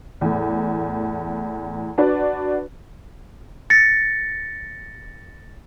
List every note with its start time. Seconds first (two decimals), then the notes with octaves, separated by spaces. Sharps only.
0.21 E2 A2
1.98 D4 F#4 B4 D5
3.70 A6 A#6 C#7